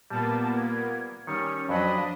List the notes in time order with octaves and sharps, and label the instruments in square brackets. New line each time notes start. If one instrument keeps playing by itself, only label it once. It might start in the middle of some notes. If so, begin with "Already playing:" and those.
[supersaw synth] A#2 A#3 B3 [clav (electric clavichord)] G3 [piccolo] A5
[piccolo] G#6
[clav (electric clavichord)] D#3 G3 [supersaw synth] C#4 [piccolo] C#7
[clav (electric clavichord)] F2 F#3 [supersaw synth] D4 D#5 [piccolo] B5